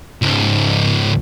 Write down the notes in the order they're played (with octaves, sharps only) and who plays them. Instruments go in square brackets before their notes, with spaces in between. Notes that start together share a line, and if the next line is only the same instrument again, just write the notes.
[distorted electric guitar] C#2 G#2